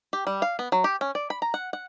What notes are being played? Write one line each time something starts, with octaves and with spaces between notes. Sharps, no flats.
G4
G3
F5
B3
F#3
G4
C#4
D5
B5
A#5
F#5
F#5